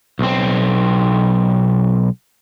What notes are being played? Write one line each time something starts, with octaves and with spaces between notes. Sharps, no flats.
B1 C4